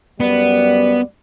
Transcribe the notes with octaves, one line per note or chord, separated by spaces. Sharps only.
F#2 G3 B3 D5